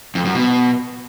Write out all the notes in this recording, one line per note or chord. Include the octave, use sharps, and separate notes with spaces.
F2
F#2
B2